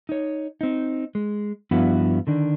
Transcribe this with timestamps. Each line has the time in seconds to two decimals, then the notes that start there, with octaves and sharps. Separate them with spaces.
0.09 D#4 C#5
0.61 C4 D#4
1.15 G#3
1.71 G2 F3 B3 D4 E4 F#4
2.27 D3 D#3 D4